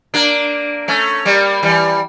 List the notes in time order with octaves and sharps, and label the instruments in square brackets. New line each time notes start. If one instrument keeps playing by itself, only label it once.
[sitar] A#3 D4
A3 C#4
G3 A#3
E3 G3